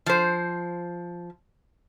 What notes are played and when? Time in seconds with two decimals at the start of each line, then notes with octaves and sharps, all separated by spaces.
0.06 F3 C5